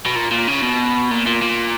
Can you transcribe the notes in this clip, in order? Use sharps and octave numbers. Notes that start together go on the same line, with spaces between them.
B2
A#2
A#2
C#3
B2
A#2
A#2
A#2